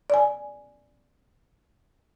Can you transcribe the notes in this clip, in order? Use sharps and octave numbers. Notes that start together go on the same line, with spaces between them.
D5 G#5